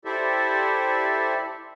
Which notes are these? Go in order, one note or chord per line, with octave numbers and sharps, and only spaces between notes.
E4 G4 A4 C5 D5 E5